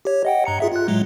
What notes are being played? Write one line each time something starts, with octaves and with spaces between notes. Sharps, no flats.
G4 C#5
D#5 F#5 G5
G2 A#5 C#7
F4 G#4 E5
F4 F#6
A2 F#3 G#3